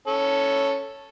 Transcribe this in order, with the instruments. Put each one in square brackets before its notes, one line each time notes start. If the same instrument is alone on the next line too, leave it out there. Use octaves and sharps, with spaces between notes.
[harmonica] C#4 A4